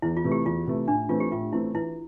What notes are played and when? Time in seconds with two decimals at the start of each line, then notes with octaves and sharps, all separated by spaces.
0.02 E2 E4
0.17 F4
0.24 C3 E3 A3
0.31 G4
0.45 E2 F4
0.67 C3 E3 A3
0.88 A2 D4
1.09 E3 A3 C4 F4
1.20 G4
1.31 A2 F4
1.52 E3 A3 C4 E4
1.74 E3 E4